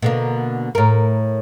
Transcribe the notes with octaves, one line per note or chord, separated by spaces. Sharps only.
B2 D3 A#3
A2 A#4